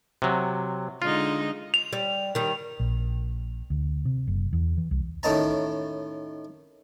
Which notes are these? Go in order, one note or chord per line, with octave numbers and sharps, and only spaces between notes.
C3 F#3
D3 G#3 D#4 F4
F7
G3
D#3 G3
A#1
D2
C3
F#1
E2
E3
C2
A2 D#3 C#4 D#5 A5 A#5